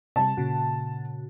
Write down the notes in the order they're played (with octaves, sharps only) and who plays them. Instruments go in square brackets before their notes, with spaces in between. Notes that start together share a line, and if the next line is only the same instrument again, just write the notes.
[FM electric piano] C3 G3 [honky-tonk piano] A5
[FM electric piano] A#2 C#3 F#4